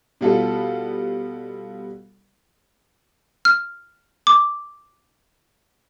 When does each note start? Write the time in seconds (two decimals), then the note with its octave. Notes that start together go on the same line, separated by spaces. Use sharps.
0.21 B2 G3 B3 F4 A4
3.45 F6
4.27 D6